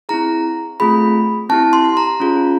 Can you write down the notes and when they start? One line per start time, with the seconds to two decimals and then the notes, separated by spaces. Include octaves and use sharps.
0.09 C4 E4 G#4 A#5
0.80 A3 C4 F4 G#4 B5
1.49 C4 E4 G4 A5
1.73 C6
1.97 A#5
2.20 C#4 F4 G#4